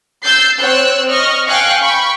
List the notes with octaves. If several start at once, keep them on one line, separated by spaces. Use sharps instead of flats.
E6 G6 A6 C7
C4 C#5 E6 F#6
D#5 C#6 F6
F5 G5 G#5 C#6 F6 F#6
G5 B5 C#6